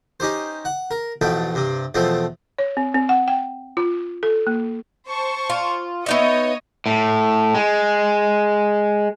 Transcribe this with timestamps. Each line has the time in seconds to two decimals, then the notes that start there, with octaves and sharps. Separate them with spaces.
0.20 C#4 D#4 G4 C5
0.65 F#5
0.91 A#4
1.21 A1 F2 B2 A3 G5
1.55 G2 C3
1.95 E2 B2 F3 A3 C4
2.59 C#5
2.77 C4
2.94 C4
3.09 F#5
3.28 G5
3.77 F4
4.23 A4
4.47 A#3
5.07 C5 A5 C#6
5.50 F4
6.06 B3 D#4 C#5 D#5 E5
6.86 A2
7.55 G#3